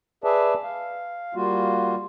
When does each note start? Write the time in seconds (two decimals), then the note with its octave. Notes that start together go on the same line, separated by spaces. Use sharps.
0.24 G#4 B4 D5 E5 A5
0.63 F5
1.35 G3 A#3 F4 F#4